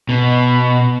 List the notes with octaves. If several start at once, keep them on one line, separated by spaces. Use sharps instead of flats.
B2